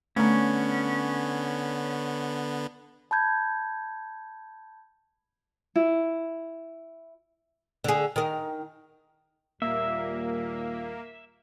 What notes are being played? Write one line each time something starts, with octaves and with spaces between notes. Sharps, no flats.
D3 A3 B3 C#4 A#5
A5 B5 G6 G#6
E4
D3 G#4
D#3 A#4
D#2 A#2 G3 A#3 E5